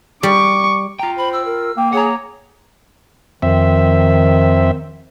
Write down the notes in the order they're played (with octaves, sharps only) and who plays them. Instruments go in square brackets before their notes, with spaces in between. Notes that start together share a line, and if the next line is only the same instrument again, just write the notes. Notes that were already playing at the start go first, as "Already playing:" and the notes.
[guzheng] G3 [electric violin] C#6 D6
[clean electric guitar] F4 G5 [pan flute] A#5
[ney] C5 [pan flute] B5
[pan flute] E6
[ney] A#4
[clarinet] A#3 [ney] G5
[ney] G#4 [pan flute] C#5 [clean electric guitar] F#5 A#5
[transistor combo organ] F2 C4 E5 [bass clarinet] D#3